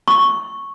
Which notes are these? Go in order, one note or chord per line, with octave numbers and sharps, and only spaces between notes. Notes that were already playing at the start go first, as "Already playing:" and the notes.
C#6